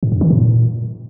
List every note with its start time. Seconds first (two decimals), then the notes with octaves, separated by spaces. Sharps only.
0.03 G#2
0.12 F#2
0.21 D#3
0.30 A#2